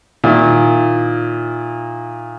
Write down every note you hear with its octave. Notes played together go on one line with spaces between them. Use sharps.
A#2 D#3 E4